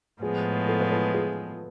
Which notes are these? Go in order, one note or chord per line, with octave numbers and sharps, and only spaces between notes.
A2 F3 G#3 B3 G#4
A4
B4
A4
G#4